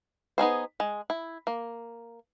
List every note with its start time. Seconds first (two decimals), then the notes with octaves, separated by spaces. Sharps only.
0.38 B3 D#4 G#4 C5
0.80 G#3
1.10 E4
1.47 A#3